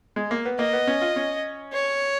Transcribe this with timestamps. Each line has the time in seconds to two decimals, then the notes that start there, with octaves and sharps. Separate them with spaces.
0.16 G#3
0.31 A#3
0.45 B3
0.59 A#3 D#5
0.73 B3
0.87 C#4
1.02 F4
1.16 C#4
1.73 C#5